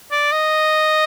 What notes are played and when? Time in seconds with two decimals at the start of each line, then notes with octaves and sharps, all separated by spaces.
0.11 D5
0.32 D#5